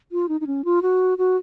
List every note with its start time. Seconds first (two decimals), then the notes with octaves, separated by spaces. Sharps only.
0.12 F4
0.29 D#4
0.41 D#4
0.47 C#4
0.65 F4
0.82 F#4
1.18 F#4